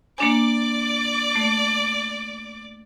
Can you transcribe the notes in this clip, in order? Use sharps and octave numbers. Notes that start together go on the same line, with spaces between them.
A#3 D4 D5 G#5 D6
A3